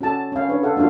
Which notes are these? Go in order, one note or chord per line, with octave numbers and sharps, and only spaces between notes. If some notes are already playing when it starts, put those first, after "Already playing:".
C#4 F#4 A4 A5
C#4 F5
D4 B4 C#5
A4 F5 F#5
A#3 D4 F4 F#4 F5